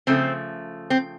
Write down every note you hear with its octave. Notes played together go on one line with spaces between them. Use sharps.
C#3 F3 A3 C4
C4